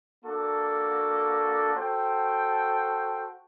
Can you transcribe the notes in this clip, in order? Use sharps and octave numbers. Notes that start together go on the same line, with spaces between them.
A#3 D4 F#4 A4
F#4 A4 C5 G5